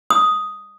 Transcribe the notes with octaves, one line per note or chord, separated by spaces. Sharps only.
D#6